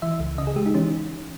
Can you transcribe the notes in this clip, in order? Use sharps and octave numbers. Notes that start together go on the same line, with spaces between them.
E3 E5
C#2
C#3 D#5
G#4
G#3 G4
D#4
E3 C#4